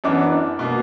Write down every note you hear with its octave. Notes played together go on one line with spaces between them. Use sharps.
F#2 E3 B3 D4 D6
B2 A#3